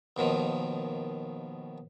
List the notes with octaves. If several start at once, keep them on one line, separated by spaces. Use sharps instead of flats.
D#2 B2 D#3 F3